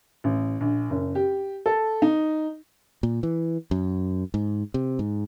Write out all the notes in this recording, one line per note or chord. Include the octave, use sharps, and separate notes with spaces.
A1
A#1
F#1
G4
A4
D#4
A#2
E3
F#2
G#2
C3
G#2